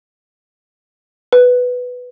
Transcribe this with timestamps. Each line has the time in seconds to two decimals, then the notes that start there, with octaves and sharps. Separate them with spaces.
1.32 B4